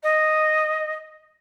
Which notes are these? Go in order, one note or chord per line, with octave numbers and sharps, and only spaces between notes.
D#5